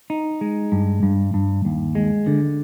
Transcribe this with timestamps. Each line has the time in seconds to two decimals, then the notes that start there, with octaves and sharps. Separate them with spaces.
0.10 D#4
0.41 G#3
0.72 G2
1.03 G2
1.34 G2
1.65 D#2
1.95 G#3
2.27 D3